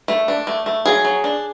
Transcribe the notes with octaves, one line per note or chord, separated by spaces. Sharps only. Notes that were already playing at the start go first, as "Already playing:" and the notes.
A3
D4
A3
A3
F#3 G#4
F#3
D4